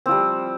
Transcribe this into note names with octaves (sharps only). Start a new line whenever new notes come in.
F3 G3 C4